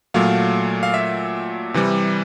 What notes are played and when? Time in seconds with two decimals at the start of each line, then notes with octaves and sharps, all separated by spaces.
0.14 A#2 F#3 A3 F5
0.83 F5
0.94 E5
1.74 C3 E3 G3